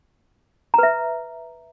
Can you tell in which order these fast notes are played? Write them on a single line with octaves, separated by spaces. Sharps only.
A#5 B4 E5